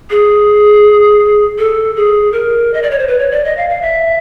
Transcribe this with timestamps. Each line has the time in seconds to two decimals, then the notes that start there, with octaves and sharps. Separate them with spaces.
0.10 G#4
1.58 A4
1.96 G#4
2.32 A#4
2.74 D#5
2.83 D5
2.91 C#5
2.99 C5
3.08 B4
3.19 C#5
3.31 D5
3.45 D#5
3.57 F5
3.69 F5
3.82 E5